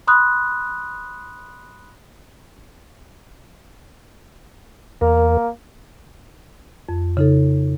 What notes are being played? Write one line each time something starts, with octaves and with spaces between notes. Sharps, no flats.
B5 C6 D#6 F#6
E2 A#3 A#4
F2
C#3 D#4 A4